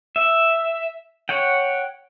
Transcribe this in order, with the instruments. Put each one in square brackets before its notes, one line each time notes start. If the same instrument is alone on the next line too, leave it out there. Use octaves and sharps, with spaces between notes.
[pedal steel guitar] E5
C#5 F#5 G5